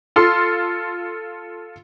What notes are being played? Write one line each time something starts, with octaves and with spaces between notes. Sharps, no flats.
F4 A4 C6